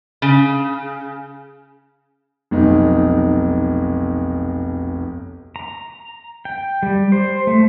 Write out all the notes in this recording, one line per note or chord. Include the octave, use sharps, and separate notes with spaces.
C#3
F1 B1 D#4
A#5
G5
G3
C5
A3